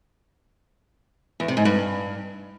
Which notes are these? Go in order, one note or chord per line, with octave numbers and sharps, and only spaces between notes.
E2
C3
G#2
G2